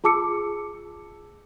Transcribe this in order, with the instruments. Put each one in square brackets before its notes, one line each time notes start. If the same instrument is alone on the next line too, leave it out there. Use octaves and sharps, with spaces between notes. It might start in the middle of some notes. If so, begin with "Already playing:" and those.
[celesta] F4 G#4 A5 D6 E6 C#7